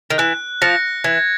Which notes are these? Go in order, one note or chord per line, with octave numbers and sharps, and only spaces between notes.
D#3
E3 F#6
F3 A#6 C#7
E3 G#6